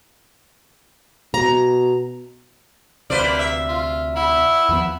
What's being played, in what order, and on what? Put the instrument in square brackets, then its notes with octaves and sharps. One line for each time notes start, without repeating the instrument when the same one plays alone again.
[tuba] B2 [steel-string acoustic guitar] A#5
[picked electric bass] D2 C3 [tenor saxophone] A#3 [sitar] B4 C5 D5
[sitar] E5
[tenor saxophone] F4
[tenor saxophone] E4 [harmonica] F#5 B5 E6
[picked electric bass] D#2 F3 B3